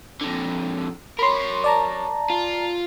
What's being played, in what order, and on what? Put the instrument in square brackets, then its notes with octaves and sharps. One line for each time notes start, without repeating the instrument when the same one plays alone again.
[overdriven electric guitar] F2 D3
[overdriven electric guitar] A#4 C#5 [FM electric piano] B5 C6
[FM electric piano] D5 A5 A#5
[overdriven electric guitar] F4